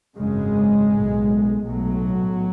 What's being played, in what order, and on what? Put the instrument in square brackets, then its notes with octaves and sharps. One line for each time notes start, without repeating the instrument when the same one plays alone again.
[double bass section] G#1 F#2 C#3 G#3
B1 A2
B1 A2 F#3